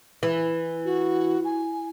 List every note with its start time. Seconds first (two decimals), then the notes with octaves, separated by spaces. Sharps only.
0.23 E3
0.85 F#4
1.44 G#5